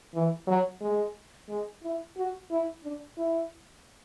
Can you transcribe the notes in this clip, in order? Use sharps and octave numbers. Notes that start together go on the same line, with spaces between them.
E3
F#3
G#3
G#3
E4
F#4
E4
D4
E4